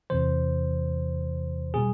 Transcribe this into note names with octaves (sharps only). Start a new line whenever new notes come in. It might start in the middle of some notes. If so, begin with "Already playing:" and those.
E2 C3 E3 C5
B2 G3 G#4